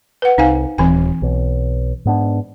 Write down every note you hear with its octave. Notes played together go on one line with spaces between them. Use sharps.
B4 F#5
C2 D#4 F5 G#5
D#1 E3 C4 G#5
B1
G#2 B3 D4